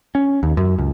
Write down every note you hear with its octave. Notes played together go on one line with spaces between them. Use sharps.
C#4
D#2
F#2
C#2